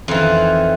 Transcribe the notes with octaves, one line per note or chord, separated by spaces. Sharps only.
F2 D#3 E3